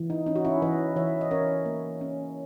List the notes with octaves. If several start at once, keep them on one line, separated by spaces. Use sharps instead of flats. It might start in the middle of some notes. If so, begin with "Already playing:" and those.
Already playing: E3
D#4
C#4 D#4
F#4
C#4 E4
E3 B4 D#5
E3 C#5 E5
D#5
C#4 A#4 C#5
A#3
C#4